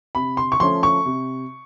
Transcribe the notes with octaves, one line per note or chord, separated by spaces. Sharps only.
C3 B5
C6
C#6
F3 A3 C#4 C6
C#6
C3